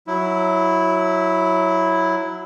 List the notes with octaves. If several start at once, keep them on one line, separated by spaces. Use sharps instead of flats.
F#3 E4